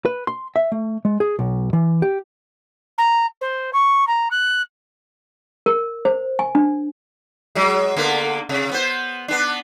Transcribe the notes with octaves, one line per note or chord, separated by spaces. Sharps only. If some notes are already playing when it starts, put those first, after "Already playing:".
B4
C6
E5
A3
G#3
G#4
B1
E3
G4
A#5
C5
C#6
A#5
F#6
A#4
C5
G#5
D4
F#3 G#3
D3 A#3 B3
C3
B3 C5
B3 D4